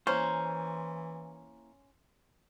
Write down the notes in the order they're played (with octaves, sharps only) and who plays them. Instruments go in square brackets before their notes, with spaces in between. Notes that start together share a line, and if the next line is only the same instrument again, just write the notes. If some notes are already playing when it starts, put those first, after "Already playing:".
[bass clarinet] E3 [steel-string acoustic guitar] A#3 E4 A#5 [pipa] C#4 [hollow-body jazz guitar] C5